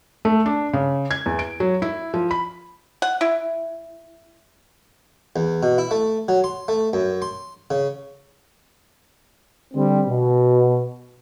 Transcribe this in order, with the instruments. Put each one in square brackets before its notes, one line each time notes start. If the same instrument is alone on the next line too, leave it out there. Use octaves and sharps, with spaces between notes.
[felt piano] A3
D4
C#3
G#6
E2
D7
F#3
E4
F3
B5
[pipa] F#5
E4
[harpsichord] E2
B2
E4
A3
F#3
C6
A3
F#2
C6
C#3
[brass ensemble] D3 G3 C4
B2